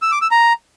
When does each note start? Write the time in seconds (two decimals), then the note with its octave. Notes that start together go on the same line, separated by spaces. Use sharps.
0.02 E6
0.12 D6
0.21 E6
0.31 A#5